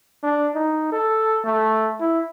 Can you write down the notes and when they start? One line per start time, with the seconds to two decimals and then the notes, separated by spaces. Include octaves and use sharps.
0.23 D4
0.55 D#4
0.92 A4
1.45 A3
2.00 E4